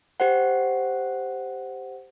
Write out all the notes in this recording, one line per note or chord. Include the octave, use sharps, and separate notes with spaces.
G4 C5 F#5